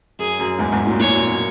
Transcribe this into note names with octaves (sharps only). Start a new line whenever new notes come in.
F#2 G#4
F#2
E2 G#2
E2 G#2
F#2 A#2
F#2 A#2 C#5
F#2 A#2
B2